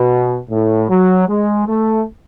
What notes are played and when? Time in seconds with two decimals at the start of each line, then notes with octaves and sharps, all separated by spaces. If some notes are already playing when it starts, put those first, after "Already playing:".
Already playing: B2
0.50 A2
0.89 F#3
1.28 G#3
1.68 A3